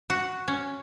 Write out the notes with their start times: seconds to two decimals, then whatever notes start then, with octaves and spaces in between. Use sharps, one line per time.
0.10 F#4
0.48 C#4